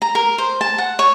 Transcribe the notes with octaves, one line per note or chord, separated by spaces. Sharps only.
A#5
A#4
C5
A5
F#5
C#5